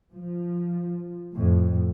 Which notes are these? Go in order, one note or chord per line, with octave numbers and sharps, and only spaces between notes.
F3
F2 A2